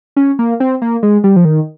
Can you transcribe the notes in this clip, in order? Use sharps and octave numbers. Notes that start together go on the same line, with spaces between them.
C#4
A#3
C4
A#3
G#3
G3
F3
D#3